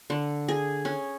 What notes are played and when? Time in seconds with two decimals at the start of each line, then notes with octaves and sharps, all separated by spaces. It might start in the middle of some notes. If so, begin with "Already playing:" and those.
0.10 D3
0.48 G#4
0.85 C#4